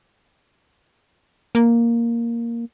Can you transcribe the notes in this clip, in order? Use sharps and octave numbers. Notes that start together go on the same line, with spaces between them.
A#3